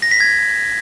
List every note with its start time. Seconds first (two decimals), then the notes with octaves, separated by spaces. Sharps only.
0.02 A#6
0.11 B6
0.20 G#6